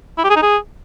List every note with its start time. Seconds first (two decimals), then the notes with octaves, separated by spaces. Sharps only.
0.18 E4
0.24 G4
0.30 G#4
0.36 D#4
0.42 G#4